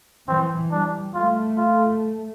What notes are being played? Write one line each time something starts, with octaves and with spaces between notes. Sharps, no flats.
E3 C4
G3 D4
A3 F4
F4